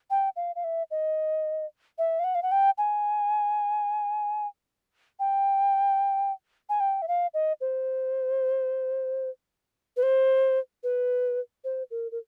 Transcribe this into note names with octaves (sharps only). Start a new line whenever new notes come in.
G5
F5
F5
E5
D#5
E5
F5
F#5
F5
F#5
G5
G#5
G5
G#5
G5
E5
F5
D#5
C5
B4
C5
B4
C5
A#4
A#4